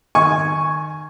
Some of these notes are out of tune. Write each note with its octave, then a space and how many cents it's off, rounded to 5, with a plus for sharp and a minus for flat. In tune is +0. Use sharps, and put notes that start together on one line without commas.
D#3 -20 G#5 +0 C#6 +0